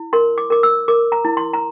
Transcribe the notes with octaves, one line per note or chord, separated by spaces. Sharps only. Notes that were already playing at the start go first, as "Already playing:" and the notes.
Already playing: E4
A#4 C6
D6
A#4 D6
E6
A#4 D6
A#5
E4
C6
A#5